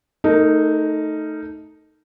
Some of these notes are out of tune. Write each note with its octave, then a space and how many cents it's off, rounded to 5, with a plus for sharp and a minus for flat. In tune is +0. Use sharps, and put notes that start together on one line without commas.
A3 +0 D#4 +0 A#4 -20